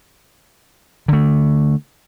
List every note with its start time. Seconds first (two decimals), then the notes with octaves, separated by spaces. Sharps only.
1.08 D3 A3